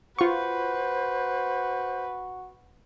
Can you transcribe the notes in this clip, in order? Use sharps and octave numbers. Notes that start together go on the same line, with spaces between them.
F4 F#4 B4 C5 C#6